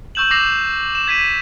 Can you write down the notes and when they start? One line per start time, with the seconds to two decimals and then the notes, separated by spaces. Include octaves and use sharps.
0.15 C#6 E6 G6 E7 F#7
0.31 D6 E6 A#6 C7 F7 F#7
0.95 E7
1.08 G#6 B6 D#7